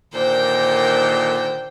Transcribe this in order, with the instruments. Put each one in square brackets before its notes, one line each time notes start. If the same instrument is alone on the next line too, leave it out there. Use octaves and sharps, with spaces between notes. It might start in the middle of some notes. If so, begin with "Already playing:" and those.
[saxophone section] A#2 D3 D#3 [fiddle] C5 G5